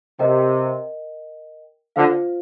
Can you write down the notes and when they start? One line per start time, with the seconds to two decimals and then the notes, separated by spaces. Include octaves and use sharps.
0.19 C3 A#4 D#5 G5
1.96 D3 F4 C5 F5